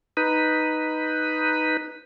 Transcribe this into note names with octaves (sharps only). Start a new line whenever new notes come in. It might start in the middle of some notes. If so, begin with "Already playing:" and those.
D#4 B4